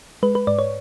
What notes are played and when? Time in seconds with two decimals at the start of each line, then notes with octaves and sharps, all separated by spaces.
0.23 G#3 B4
0.35 B4
0.47 G#2 D5
0.59 C#5